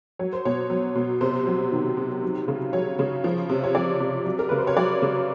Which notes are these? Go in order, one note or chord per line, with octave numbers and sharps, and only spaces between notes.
F#3 C#5
C5
B2 C#5
F#3
B2
C3 C5
F#3
D#3
C3
F#3
C#3
F#3 C#5
C#3
F3
C3
C#5
F3 D5
C3
F#3
A#4
C#3 B4
C5
C#5
F#3 D5
C#3